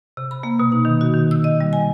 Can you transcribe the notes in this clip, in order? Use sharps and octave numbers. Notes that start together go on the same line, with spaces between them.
C3
B5
A#3
B2
D#4
D#3
F#4
D#3
E6
D#5
G3
G#5